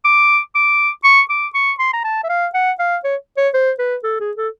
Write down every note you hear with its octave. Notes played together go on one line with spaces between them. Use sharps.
D6
D6
C#6
D6
C#6
C6
A#5
A5
E5
F5
F#5
F5
C#5
C#5
C5
B4
A4
G#4
A4